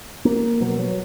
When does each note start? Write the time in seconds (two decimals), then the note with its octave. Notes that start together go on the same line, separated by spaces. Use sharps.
0.25 A#3
0.61 B2 F#3
0.79 F#3